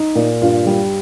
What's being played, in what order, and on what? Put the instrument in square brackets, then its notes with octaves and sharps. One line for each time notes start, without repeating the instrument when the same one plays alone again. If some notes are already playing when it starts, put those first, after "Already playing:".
Already playing: [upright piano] D#4
A#2
G2 F4
G3